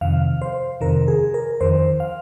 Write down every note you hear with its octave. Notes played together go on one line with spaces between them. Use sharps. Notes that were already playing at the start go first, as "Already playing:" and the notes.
F2 C3 D#3 F5
C5
F2 C3 D#3 A#4
G#4
A#4
F2 D#3 C5
F5